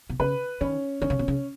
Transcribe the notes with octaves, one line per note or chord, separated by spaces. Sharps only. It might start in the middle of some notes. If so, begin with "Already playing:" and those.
B2
C#3 B4
D#3 C#4
D#3 C#4
C#3
B2
C#3